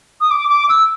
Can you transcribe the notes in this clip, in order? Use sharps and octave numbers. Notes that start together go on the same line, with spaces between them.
D#6
D6
D6
E6